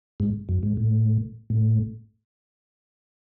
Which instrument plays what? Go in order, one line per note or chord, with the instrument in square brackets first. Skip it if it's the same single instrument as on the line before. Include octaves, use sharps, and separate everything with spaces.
[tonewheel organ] G#2
F#2
G#2
A2
A2